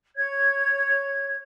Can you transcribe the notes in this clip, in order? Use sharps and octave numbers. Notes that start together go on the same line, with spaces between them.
C#5 G#6